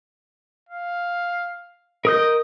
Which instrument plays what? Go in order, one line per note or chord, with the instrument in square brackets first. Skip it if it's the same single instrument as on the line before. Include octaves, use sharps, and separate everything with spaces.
[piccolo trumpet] F5
[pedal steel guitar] A#4 D#6 G6 [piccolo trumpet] D#5